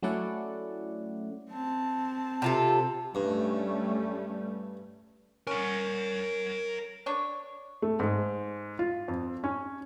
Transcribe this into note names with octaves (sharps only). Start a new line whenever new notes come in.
F#3 A3 C#4 E4 D5 F#5
C4 A5
C3 F4 A4
G2 G3 A3 C#4
C#4 A#4 F#5
D4 C#5
A3
G#2
F4
F2
C#4